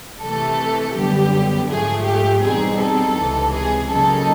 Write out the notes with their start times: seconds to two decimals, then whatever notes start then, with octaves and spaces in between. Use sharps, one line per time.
0.21 C3 E3 A3 A4
0.95 F#2 D3 G3 B3 G4
1.70 G#2 F3 A3 G#4
2.06 G4
2.43 E2 B2 G3 C4 D#4 G#4
2.80 A4
3.17 C#2 C3 E3
3.54 G#4
3.91 C#3 F#3 A#3 D#4 A4